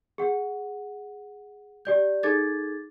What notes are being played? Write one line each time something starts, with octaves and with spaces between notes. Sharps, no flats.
G#4 F#5
G4 D5 G6
D#4 G#4 A4 D6 G#6 A6